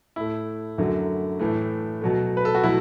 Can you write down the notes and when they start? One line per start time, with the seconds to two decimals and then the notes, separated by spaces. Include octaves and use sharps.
0.16 A2 A3 E4
0.78 F#2 D3 F#3 A3
1.39 A2 E3 A3
2.01 B2 F#3 A3
2.37 B4
2.45 A4
2.55 F#4
2.63 B2 F#3 A3 E4